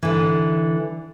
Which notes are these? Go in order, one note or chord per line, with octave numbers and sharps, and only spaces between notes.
D3 E3